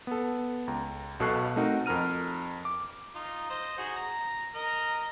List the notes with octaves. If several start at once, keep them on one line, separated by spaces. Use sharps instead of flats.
B3 A4
C#2 A#5
B1 B2 A4 C#6 F#6 C7
A3 C4 D#4 F#4 A#4
F2 A#4 A#5 F6 D#7
D6
D#4 F4
C5 D#5
D#4 F#4 G#4
A#5
A#4 D#5 A#5